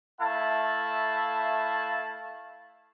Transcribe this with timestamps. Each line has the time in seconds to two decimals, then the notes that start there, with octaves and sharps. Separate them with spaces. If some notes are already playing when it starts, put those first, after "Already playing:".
0.21 A3 E4 F5 A5